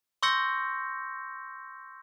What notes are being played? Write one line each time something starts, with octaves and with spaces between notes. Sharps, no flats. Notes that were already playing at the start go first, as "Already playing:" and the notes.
C6 C#6 E6 G6 A#6 C#7